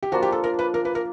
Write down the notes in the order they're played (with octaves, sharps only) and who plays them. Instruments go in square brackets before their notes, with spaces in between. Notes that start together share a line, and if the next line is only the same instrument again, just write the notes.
[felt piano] G4
[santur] F3 A#3 D4 F4 [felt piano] F#4
[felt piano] G4
A4
A#4
B4
A#4
B4
A#4